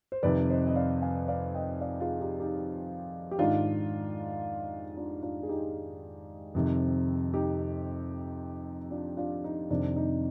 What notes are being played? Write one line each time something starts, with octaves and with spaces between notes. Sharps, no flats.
C5
F2 C3 D#3 B4 D5
C5 D#5
D#5
D5 F5
F5 G#5
D5 F5
D#5 G5
D5 F5
F4 G#4
D#4 G4
D#4 G4
G4
G#2 D#3 D4 F4
D4 F4
D4 F4
G#4
D#4 G4
F2 C3 D#3
D#4 G4
D4 F4
D4 F4
D#4
F2 C3 D#3 D4
D#4